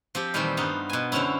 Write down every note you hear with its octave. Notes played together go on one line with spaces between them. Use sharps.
F3 C4 G4
A#2 D#3 E3 G3 A3 C4
G2 B3 D#4 F4
B2 G#5
F#2 D3 C4 C#4 E4